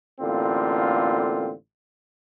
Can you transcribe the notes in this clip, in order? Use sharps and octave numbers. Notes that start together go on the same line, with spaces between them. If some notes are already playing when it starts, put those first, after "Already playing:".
A1 D3 A#3 C4 F4